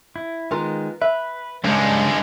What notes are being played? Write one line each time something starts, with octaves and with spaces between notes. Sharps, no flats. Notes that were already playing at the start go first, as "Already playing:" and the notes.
E4
D#3 G#3 B3 F4 A#4
B4 E5
C#2 G2 G#3 C#4 D4